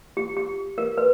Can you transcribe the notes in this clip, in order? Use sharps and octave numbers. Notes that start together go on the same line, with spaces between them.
G4
G4
A#4
B4